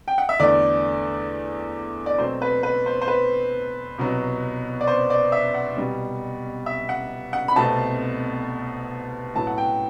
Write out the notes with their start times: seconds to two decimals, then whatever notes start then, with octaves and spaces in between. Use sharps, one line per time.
0.08 G5
0.18 F#5
0.29 E5
0.39 E2 D3 A3 D5
2.06 D5
2.18 B2 F#3 A3 C4 C5
2.42 B4
2.63 B4
2.86 C5
3.01 C5
3.08 B4
3.98 C2 B2 F#3
4.81 D5
4.87 C5
5.10 D5
5.32 E5
5.54 F#5
5.76 C2 B2 G3
6.66 E5
6.89 F#5
7.33 F#5
7.48 B5
7.56 C2 B2 A3 C4 A5
9.35 A2 F#3 B3 A5
9.47 F#5
9.58 G5